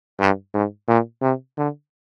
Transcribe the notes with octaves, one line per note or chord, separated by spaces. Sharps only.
G2
G#2
A#2
C3
D3